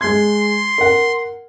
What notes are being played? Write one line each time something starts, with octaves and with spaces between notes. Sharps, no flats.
G#3 C6 G#6
A#4 F#5